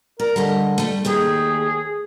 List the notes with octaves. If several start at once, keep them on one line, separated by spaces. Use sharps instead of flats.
A#4 D5
D3 G3 A#4 D#5
G3 A3
D#2 A3 G4 G#4